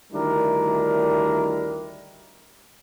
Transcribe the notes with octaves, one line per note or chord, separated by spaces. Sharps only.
D2 D#3 G3 D4 E4 A#4